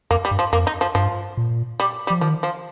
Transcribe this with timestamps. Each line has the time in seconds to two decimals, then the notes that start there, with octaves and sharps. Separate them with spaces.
0.11 F2 A#3
0.25 G3
0.31 G2
0.39 F3
0.53 F2 A#3
0.67 D#4
0.81 F3
0.95 G2 F3
1.37 A#2
1.80 G3
2.07 G3
2.10 F3
2.21 D#3 F3
2.43 F3